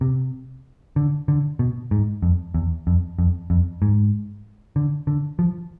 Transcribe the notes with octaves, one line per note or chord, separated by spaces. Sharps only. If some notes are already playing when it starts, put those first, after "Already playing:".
C3
D3
D3
B2
G#2
F2
E2
F2
F2
F2
G#2
D3
D3
F3